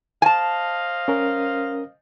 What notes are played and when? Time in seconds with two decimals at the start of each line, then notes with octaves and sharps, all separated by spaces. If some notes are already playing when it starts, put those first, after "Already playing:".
0.22 C5 D#5 F5 G#5 A5
1.08 C#4 A#4